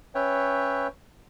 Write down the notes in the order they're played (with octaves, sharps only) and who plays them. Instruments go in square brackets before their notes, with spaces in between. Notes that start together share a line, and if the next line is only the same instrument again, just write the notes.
[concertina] C#4 B4 C#5 E5 G5